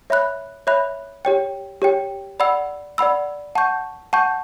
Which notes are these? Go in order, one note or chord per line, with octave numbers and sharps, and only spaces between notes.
C#5 E5 B5 F#6
C#5 E5 B5 F#6
G4 C#5 G5
G4 C#5 G5
D5 F#5 B5 E6
D5 F#5 B5 E6
F#5 A5 C#6 G6
F#5 A5 C#6 G6